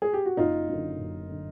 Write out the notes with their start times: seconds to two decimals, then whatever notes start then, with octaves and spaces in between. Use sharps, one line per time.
0.02 G#4
0.13 G4
0.26 F#4
0.37 F#1 D#4 F4
0.69 F#2 D3
0.98 F#1
1.29 D3